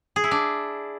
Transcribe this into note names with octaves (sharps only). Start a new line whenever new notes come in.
G#4
E4
D4